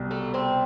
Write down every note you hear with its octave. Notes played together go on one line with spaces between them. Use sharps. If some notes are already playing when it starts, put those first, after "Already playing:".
Already playing: C2 B2 G3
A3
C4